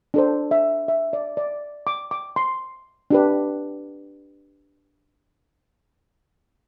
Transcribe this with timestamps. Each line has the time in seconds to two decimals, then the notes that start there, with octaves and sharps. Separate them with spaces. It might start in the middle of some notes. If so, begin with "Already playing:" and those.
0.14 D4 A4 C5
0.51 E5
0.88 E5
1.13 D5
1.37 D5
1.87 D6
2.11 D6
2.36 C6
3.11 D4 G4 B4